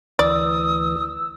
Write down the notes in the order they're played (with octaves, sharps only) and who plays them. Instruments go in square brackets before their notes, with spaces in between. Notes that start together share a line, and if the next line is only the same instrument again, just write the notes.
[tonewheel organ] D2 E3 [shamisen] D5 [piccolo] D#6 [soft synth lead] E6